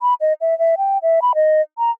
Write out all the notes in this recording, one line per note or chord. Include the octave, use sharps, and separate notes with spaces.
B5
D#5
E5
E5
G5
E5
B5
D#5
A#5